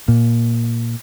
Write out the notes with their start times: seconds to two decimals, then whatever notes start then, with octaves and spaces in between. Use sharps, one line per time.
0.08 A#2